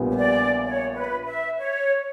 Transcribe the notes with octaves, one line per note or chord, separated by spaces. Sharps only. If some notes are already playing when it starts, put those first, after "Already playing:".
Already playing: A#1 A#2 G3 B3
C#5
D5
C#5
B4
E5
C#5